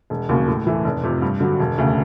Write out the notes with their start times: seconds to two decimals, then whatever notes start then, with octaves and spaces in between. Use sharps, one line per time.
0.10 E1
0.29 D#2 C#3 F#3 A#3
0.47 A2
0.67 E3 A3
0.84 F1
1.03 F2 C3
1.22 G2
1.40 D3 F#3
1.60 E1
1.78 D2 C#3